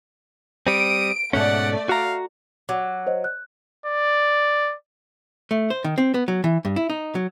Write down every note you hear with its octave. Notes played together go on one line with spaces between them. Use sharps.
G3 C4 D#6 D7
G#2 B2 A3 C#4 D5 F#5
F#4 F5 A#5
F#3 D6
C5 C#5 D#5
F#6
D5
A3
C5
D#3
C4
B3
F#3
E3
G2
E4
D#4
F#3